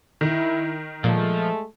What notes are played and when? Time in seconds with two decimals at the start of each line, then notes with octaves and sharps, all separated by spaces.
0.21 D#3 E4
1.04 A#2 F3 G#3 A3